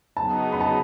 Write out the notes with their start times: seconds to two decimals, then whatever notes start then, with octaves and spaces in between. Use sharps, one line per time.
0.17 C#3 F#3 B3 D#4 A5
0.52 B5
0.61 A5